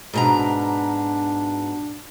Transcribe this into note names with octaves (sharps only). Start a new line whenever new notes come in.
G#2 B2 D4 A#5